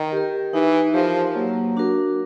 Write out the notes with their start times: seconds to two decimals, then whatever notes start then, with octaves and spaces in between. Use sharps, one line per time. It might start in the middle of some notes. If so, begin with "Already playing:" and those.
Already playing: D#3
0.12 G4 A#4
0.53 E3 D#4
0.94 F3 G4 A#4
1.35 F#3 A#3
1.77 D4 F#4 A#4